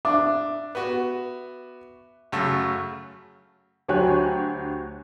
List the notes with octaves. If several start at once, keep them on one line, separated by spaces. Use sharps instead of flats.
D4 E5 D6
B3 F#4
F#2 C#3 A3
D2 F#3 G4 C#5 G#5 F#6